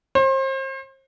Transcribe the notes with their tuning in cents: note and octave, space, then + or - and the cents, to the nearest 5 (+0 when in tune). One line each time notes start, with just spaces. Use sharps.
C5 +35